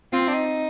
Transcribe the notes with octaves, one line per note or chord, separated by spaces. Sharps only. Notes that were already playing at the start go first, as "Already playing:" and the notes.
C4 F4
D4
D#4